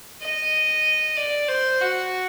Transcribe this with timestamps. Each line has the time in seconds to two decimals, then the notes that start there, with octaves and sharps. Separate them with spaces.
0.21 D#5
1.16 D5
1.48 C5
1.81 F#4